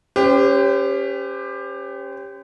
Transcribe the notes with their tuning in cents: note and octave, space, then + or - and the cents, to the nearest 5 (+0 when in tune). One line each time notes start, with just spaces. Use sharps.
C#4 +0 G4 +15 C5 -40